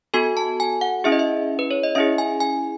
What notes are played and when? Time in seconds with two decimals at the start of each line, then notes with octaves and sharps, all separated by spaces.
0.14 B3 F#4 A4 G#5
0.37 A5
0.60 G#5
0.81 F#5
1.04 C#4 E4 G#4 E5
1.12 D#5
1.19 E5
1.59 B4
1.71 C#5
1.84 D#5
1.95 C#4 E4 G#4 E5
2.18 G#5
2.40 G#5